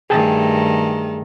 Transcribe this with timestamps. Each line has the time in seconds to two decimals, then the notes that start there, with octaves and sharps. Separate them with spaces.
0.10 G2 D#3 A3 G#4 G5 A5